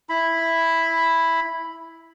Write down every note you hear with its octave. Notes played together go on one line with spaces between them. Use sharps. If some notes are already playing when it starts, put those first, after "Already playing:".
E4 B5